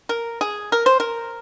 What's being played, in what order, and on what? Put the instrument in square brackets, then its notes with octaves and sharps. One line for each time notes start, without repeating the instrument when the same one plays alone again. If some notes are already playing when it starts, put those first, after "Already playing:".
[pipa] A#4
G#4
A#4
C5
A#4